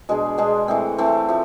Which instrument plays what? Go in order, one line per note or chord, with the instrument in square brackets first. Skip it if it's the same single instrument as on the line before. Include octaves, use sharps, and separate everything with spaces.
[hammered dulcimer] B2 G#3 D4 G#4
B2 G#3 D4 G#4
E3 A3 C4
E3 A3 C4
F3 A3